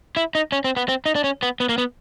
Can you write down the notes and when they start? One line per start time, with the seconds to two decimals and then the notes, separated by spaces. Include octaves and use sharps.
0.17 E4
0.35 D#4
0.52 C#4
0.64 C4
0.77 B3
0.89 C4
1.06 D#4
1.15 D4
1.24 C#4
1.43 B3
1.60 B3
1.69 A#3
1.78 B3